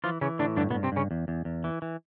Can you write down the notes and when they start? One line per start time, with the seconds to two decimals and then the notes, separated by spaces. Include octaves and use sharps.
0.04 E3 F3 F4
0.21 C#3 E3 C#4
0.39 A2 D3 D4
0.56 G2 D3 D4
0.70 B2 B3
0.74 G2
0.83 C3 C4
0.92 G2 C#3 C#4
1.11 E2
1.28 E2
1.45 E2
1.64 E3
1.82 E3